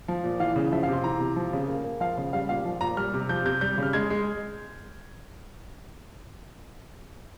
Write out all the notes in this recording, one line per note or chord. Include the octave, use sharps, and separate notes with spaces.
F3
A#2
E3 F5
C#3
F3 E5
F5
C3
C6
E3 A#5
C3
F3
C#3
A#3
A#3
F3 F5
C#3
G3 F5
A#2 F5
F3
A#2 A#5
G3 F6
C3
F3 G6
C3 G6
G3 G6
C#3 F6
G#3 G#6
G#3